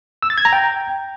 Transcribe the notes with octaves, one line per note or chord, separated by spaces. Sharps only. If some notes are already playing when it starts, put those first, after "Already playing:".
E6
A6
G#6
A#5
G5